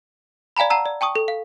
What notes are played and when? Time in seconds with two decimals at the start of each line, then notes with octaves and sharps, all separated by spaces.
0.57 D5 F5 G#5 A#5 B5
0.70 F#5 A5 A#5 E6
0.86 D5
1.01 G5 A5 C#6 D#6
1.15 A4
1.28 F5